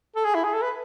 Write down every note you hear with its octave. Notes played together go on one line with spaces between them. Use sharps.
A4
G#4
E4
G#4
A4
B4